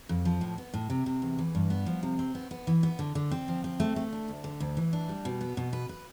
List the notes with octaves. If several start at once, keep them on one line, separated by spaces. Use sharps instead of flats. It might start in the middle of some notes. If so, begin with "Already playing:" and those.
F2
F3
A2
B3
A2
C3
C3
E2
E3
G2
B3
F3
C3
C4
B3
B3
E3
B3
D3
D3
C4
F3
C4
A3
A3
D4
D2
D3
D2
E3
D4
G3
B2
B3
B2
B4
B4